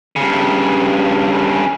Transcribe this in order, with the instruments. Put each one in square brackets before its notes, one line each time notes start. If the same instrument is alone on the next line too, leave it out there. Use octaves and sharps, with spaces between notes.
[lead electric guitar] G2 C#3